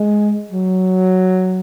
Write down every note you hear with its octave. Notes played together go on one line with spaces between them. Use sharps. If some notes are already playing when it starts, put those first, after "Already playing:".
Already playing: G#3
F#3